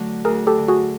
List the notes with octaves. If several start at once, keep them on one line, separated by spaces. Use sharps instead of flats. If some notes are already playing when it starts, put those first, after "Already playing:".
Already playing: D3 F#3 A3
D2 G#4 A#4
G4 A4
D3
F#4 G#4